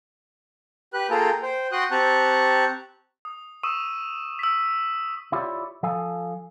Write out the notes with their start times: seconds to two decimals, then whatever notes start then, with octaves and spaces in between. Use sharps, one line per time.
0.93 G4 B4 F#6
1.10 A#3 F4 G#4 A4 G5 A#5
1.42 C5 G5
1.72 F#4 G5 C6 D#6 F#6
1.91 C4 G4 A5 A#5 C#6 F#6
3.25 D#6
3.63 C#6 D#6 E6 D#7 E7
4.39 E6 B6
5.32 E4 F4 G4 A4 C#5 D5
5.83 F3 A4 F5 G#5